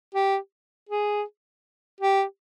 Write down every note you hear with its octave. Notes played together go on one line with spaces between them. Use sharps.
G4
G#4
G4